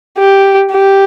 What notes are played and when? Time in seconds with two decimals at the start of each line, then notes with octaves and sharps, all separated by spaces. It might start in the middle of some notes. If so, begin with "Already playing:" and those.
0.19 G4
0.72 G4